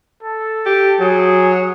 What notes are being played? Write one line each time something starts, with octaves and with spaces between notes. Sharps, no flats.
A4
G4
F#3 G#4